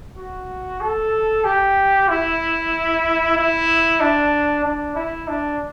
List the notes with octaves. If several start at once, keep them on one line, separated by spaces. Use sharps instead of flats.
F#4
A4
G4
E4
E4
D4
D4
E4
D4